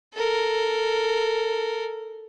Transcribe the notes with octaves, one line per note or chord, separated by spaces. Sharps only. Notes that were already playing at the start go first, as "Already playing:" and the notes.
A4 A#4